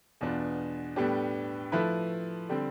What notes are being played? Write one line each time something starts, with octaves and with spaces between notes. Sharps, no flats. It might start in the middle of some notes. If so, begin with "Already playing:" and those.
E2 B2 B3 D4 F4
A2 G3 B3 D4 G4
F3 A3 E4 B4
D3 G3 C4